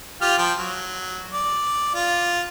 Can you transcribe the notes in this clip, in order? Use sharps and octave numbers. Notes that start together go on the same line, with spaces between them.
F4 G4 F6
F3 G5
F#3
D5
F4